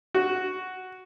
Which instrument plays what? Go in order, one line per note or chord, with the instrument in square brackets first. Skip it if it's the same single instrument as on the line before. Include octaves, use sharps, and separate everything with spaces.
[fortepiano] F#4